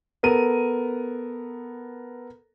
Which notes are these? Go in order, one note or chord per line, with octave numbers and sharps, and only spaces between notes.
B3 A4 A#4 D#7